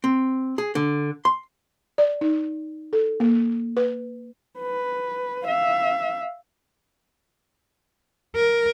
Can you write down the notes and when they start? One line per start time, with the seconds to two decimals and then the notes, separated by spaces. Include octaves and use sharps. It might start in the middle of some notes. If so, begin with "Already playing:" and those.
0.04 C4
0.58 G#4
0.75 D3
1.25 C6
1.98 D5
2.21 D#4
2.93 A4
3.20 A#3
3.77 B4
4.59 B4
5.45 E5 F5
8.36 A#4